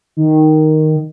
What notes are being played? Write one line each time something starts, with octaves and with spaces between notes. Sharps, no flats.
D#3